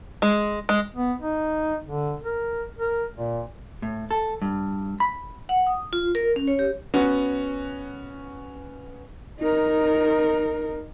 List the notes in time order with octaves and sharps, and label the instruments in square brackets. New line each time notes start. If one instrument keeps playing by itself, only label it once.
[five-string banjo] G#3
G#3
[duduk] B3
D#4
D3
A#4
A#4
A#2
[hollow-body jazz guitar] A2
A4
G2
B5
[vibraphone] F#5
D#6
F4
A#4
C#4
C#5
G4
[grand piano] B3 C#4 F#4
[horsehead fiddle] D#4 A#4